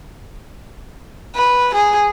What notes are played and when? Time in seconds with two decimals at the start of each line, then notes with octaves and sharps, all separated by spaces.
1.36 B4
1.74 G#4